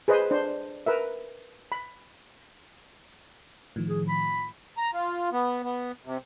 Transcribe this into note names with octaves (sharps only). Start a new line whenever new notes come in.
G#4 B4 C5 D#5
D4 C5
A#4 B4 E5
B5
A2 D#3 F3
G#4
B5
A#5
F4
B3
B3
C3